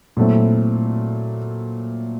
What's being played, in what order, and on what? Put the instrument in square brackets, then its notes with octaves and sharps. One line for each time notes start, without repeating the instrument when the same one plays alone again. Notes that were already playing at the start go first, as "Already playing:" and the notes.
[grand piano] A#2 F#3 A3 C4 E4